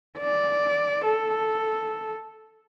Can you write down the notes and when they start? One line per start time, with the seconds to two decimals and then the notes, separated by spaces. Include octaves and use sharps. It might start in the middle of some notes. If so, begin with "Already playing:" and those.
0.18 D5
1.05 A4